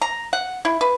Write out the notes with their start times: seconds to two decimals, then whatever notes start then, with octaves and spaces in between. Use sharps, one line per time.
0.02 A#5
0.33 F#5
0.65 E4
0.81 B4